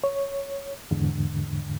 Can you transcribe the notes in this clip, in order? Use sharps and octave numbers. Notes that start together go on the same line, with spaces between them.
C#5
E2 G#2 D3